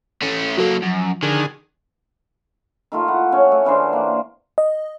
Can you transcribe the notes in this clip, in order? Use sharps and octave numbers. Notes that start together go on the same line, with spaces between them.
A3 C#4
F#3 A#3 F#4 A4
F#2 F3
D3 D#3 G#4
D#3 A3 F4
E4 F#5
C#4 C#5
A3
C#3 E3 D4 C5
A#3
D#5